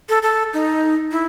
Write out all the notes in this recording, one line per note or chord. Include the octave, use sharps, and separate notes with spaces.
A4
A4
D#4
E4